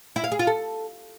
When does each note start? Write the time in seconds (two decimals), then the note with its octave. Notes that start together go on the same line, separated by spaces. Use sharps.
0.16 E4
0.24 F5
0.32 G#4
0.39 F4
0.47 A4